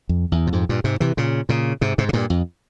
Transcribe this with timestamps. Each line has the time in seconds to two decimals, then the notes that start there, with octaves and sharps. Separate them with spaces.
0.09 F2
0.32 E2
0.47 A#2
0.52 F2 G#2
0.69 G2 A#2
0.84 G#2 C3
1.00 C3 E3
1.17 A#2 C#3
1.49 A#2 C#3
1.81 G#2 C3
1.98 G#2 C3
2.09 C3
2.13 G2 A#2
2.30 F2